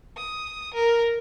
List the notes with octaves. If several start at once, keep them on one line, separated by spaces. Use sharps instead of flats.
D#6
A#4